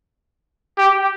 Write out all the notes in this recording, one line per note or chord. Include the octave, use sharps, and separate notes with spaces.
G4